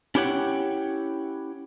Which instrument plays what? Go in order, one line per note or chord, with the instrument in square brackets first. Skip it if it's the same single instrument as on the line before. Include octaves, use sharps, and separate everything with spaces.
[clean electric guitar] C#4 E4 G4 C#5 F#5 G5